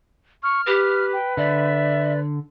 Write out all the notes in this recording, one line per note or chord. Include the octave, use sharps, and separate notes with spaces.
C#6 F6
G4 B4
G5
D3 D5 E5